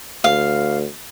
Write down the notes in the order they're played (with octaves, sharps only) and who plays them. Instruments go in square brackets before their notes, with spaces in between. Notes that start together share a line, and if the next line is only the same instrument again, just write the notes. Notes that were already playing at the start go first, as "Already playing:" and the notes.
[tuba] D2 [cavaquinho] F5